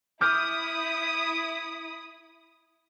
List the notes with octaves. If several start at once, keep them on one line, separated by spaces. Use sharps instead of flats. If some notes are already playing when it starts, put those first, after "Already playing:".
E4 D6 D#6 F6 G6